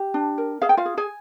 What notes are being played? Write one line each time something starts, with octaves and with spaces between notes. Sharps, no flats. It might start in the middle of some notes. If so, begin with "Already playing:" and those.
Already playing: G4
D4
A#4
G#4 F5
G5
F4 F5
G#4
G#4 G#5